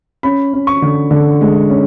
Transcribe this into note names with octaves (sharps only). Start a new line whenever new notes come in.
C#4 B5
C#4
C#6
D3
D3
G#3
C#4